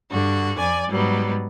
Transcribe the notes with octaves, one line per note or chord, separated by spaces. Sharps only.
G2 D3 F#4
F2 D5 G#5
G#2 F#3 G3 B3